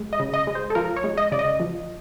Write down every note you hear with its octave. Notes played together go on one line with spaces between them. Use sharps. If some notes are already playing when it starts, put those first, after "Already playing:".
Already playing: G#3
D#5
C#3
D#5
G#3
C5
A4
F3 A#4
C#5
G#3
D#5
C#3 D5
D#5
F3